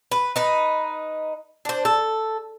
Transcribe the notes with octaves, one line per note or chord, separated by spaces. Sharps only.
B4
D#4 B4
D4 C5
A4